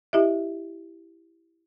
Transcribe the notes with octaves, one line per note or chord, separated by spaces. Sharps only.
E4 G4 D#5 E5